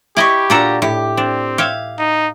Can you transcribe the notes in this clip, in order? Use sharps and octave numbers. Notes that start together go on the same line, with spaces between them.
E4 G4 D5 D#5 B5 C#6
A#2 D4 F4 F#4 A4 A#5
A2 G4
C4 D4
G4 C#5 E5 F5
D#4